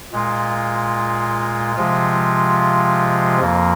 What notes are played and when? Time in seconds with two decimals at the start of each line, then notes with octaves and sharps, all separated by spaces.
0.12 A#2 G#3 F4
1.75 C3 F3 G#3 F4
3.40 F2 F3 A#3